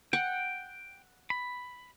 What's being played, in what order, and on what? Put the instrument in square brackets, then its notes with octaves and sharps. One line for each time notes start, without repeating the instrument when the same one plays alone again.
[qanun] F#5 [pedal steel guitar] G5
[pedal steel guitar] B5